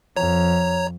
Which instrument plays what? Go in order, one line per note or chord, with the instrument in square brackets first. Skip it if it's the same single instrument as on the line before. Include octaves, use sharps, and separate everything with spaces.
[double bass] F2 [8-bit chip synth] C#5 A#5